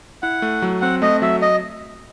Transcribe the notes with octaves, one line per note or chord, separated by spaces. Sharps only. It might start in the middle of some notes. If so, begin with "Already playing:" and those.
E4 F#5
A3
F#3
C4 F#5
A3 D#5
F#3 E5
D#5